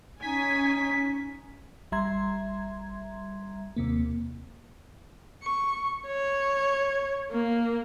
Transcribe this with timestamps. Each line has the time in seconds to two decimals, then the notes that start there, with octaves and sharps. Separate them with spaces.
0.22 C#4 D#4 G#5 B6
1.92 G#1 G3 E5 A#5 C6 G#6
3.76 D#2 C3 A#3
5.43 C#6
6.06 C#5
7.31 A#3